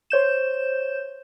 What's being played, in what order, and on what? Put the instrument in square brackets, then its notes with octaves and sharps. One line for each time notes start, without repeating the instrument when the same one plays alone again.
[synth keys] C5 C#5 G6 E7